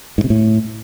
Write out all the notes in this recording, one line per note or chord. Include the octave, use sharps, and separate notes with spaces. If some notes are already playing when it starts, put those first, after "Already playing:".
G#2
C3
A2